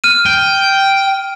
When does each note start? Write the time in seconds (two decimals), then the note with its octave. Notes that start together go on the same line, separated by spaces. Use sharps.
0.04 F6 D#7
0.26 G5